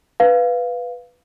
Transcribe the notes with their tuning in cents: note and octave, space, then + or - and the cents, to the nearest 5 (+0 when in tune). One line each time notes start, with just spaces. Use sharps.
B4 +0 F5 +0